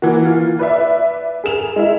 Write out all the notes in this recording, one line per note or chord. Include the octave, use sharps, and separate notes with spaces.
E3 A#3 F#4
F4
B4 D5 E5
G#4 A#4 E7 F7
G#3 E4 E5